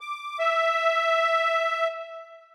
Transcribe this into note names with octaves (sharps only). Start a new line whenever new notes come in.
D6
E5